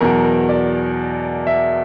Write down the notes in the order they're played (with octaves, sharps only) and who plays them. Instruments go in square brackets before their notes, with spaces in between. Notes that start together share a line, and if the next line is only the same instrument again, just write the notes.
[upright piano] E2 B2 F#3 A#4
A#4
D5
E5